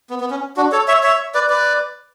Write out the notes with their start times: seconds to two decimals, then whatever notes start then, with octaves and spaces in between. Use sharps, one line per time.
0.10 B3
0.20 B3
0.31 C#4
0.57 D4 F#4
0.72 A4 C#5
0.88 C#5 E5
1.03 C#5 E5
1.34 B4 D5
1.50 B4 D5